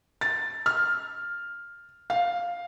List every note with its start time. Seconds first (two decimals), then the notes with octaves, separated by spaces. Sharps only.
0.21 A6
0.66 F6
2.10 F5